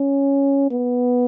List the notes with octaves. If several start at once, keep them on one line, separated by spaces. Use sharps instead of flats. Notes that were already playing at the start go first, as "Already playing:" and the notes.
Already playing: C#4
B3